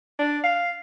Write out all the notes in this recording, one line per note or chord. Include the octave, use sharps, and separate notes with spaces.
D4
F5